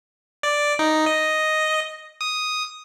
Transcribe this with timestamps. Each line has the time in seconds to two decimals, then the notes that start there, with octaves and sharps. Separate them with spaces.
0.43 D5
0.79 D#4
1.06 D#5
2.21 D#6